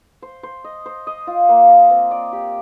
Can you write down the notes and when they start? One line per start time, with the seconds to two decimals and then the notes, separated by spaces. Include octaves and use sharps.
0.22 C5
0.43 C5
0.64 D#5
0.86 C5
1.07 D#5
1.27 F4
1.49 A#3
1.69 D#5
1.90 C4
2.11 D5
2.33 G4